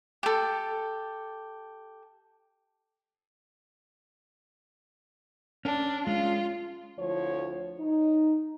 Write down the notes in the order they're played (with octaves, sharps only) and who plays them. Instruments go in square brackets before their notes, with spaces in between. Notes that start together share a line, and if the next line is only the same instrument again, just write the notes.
[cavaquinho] G4 A4
[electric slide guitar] C#4 [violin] D4
[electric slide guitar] G#3 C#4 [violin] F4
[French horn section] D2 F3 E4 C#5
D#4